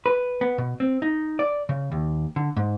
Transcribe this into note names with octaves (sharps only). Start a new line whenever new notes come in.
B4
B3
B2
C4
D#4
D5
C#3
D#2
D3
G#2